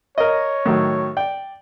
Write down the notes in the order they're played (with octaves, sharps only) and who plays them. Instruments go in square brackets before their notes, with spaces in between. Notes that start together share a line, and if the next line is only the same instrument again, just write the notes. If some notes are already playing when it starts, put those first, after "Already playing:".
[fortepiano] A#4 D#5 [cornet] C#5
[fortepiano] A2 D#3 F#3
D5 G5